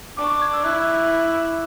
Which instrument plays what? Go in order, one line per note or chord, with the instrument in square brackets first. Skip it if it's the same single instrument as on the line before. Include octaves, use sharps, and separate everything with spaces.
[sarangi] D4 [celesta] D6
[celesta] C#6
D6
G#6
E6
[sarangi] E4 [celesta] F#6